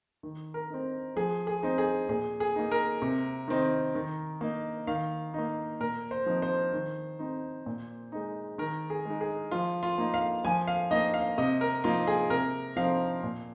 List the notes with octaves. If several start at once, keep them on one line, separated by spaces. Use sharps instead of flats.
D#3
A#4
C4 D#4
F3 G#4
G#4
C4 D#4
G#4
A#2 G#4
G#4
A#3 D#4
A#4
C3
D#3 C4 D#4
D#3
A#3 D#4
D#3 F5
A#3 D#4
A#2 A#4
C5
F3 C4 D#4
C5
D#3
C4 D#4
A#2
G#3 D#4
D#3 A#4
G#4
G#3 D#4
G#4
F3 F4
F4
A#3 D#4
F5
F3 G#5
F5
A#3 D#4 D#5
F5
C3 D#5
A#4
F3 A#3 D#4 F4
G#4
C3 A#4
F3 C4 D#4 F5
A#2